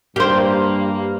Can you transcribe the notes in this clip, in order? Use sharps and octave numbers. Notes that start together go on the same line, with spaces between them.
G2 A#3 G4 C5